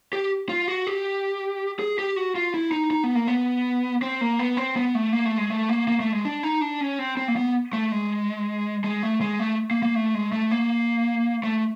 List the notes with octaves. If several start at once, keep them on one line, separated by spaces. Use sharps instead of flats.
G4
F4
F#4
G4
G#4
G4
F#4
F4
E4
D#4
D#4
B3
A#3
B3
C4
A#3
B3
C4
B3
A3
A#3
A3
G#3
A3
A#3
A#3
A3
G#3
D4
D#4
D4
C#4
C4
C4
A#3
B3
A3
G#3
G#3
A3
G#3
A3
A#3
A#3
A3
G#3
A3
A#3
A3